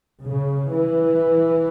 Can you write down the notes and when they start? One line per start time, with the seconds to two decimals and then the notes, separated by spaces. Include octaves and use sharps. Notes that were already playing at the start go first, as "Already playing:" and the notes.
0.22 C#3
0.72 E3